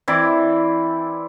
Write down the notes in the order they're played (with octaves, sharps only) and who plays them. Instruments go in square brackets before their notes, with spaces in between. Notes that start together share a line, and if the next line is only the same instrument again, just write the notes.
[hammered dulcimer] E3 C4 E4 D5